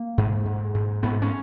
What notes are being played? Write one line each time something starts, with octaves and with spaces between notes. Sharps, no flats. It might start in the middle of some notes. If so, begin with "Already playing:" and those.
Already playing: A#3
G#2
G#2
G#2
G#2 B3
C#4